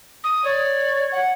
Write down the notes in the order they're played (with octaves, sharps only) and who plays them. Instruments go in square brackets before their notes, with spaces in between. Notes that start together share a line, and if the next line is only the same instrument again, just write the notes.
[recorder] D#6
[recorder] C#5 [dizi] D5
[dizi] F#5